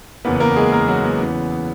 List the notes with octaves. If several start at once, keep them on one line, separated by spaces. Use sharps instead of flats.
F#1 E2 C#3 E3 A#3 B3 B4
A#3 A#4
G#3 G#4
A#3 A#4
F#3 F#4
B3
E2 C#3 E3